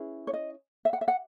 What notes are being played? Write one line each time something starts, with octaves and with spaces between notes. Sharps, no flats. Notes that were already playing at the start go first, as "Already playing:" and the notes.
Already playing: C#4 E4 G#4 B4
C#5
D#5
E5
F#5
E5
F#5